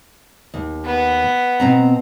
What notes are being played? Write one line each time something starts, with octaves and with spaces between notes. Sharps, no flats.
D#2
B3
B2 C4 A#5